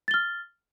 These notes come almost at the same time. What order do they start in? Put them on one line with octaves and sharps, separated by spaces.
A6 G7 F6